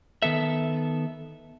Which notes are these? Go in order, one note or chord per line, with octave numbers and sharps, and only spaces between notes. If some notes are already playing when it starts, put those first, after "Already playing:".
D#3 B3 A4 E5